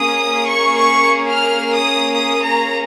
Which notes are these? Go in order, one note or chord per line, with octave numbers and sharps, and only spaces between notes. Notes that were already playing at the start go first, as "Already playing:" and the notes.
Already playing: A#3 C#4 G#4 D#6
C#6
C#6
F6
D#6
D#6
A#5